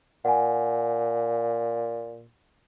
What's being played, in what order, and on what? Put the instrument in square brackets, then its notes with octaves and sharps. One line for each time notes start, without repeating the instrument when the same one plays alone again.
[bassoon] A#2 [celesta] F#5 G#5